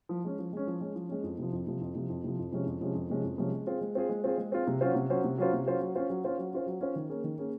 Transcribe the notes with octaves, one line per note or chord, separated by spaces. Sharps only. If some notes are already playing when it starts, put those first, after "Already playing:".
F3
G#3 C#4
F3
G#3 C#4
F3
G#3 C#4
F3
G#3 C#4
F2
C3 F3
F2
C3 F3
F2
C3 F3
F2
C3 F3
F2
C3 F3 G#3 C#4
F2
C3 F3 G#3 C#4
F2
C3 F3 G#3 C#4
F2
C3 F3 G#3 C#4
G#3
C4 F4 G#4
G#3
C4 F4 G#4
G#3
C4 F4 G#4
G#3
C4 F4 G#4
C3
F#3 C#4 F4 C5
C3
F#3 C#4 F4 C5
C3
F#3 C#4 F4 C5
C3
F#3 C#4 F4 C5
F#3
C#4 F4 C5
F#3
C#4 F4 C5
F#3
C#4 F4 C5
F#3
C#4 F4 C5
D#3
A#3 C#4 G#4
D#3
A#3 C#4 G#4